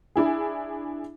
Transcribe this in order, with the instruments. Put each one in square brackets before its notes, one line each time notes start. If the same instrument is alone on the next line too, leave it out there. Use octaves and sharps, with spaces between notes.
[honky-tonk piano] D4 E4 G#4